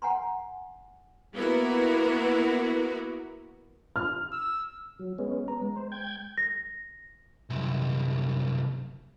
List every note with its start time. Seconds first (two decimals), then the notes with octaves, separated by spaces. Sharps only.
0.02 F#5 G#5 A#5 C6
1.35 A#3 B3 E4 F#4 A#4
3.96 F6
4.32 E6
4.99 F#3
5.18 G#3 B3 C#4
5.48 B3 A#5
5.62 G#3
5.76 C5
5.92 G5 G6 G#6
6.38 A#6
7.50 C2 F#2